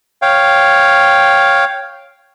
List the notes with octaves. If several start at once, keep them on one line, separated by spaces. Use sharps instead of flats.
C#5 F5 G5